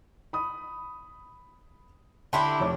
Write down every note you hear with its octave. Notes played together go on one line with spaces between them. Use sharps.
B5 D#6
D3 E4 G4 E5 A5 C6
F1 C#5 D6